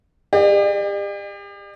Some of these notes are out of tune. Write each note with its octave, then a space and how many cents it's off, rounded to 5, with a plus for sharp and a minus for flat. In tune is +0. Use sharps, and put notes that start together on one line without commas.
G4 +40 D5 +45